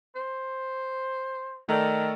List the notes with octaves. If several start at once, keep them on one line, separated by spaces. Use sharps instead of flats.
C5
D#3 A3 A4 D5